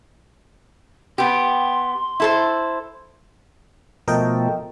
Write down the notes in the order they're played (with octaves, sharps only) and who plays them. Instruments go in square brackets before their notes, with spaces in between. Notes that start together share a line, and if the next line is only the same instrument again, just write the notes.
[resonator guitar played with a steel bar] B3 G4 [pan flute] C6
[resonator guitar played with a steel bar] E4 A4 C5
[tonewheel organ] B2 F3 A3 [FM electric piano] A#4 D#5 G5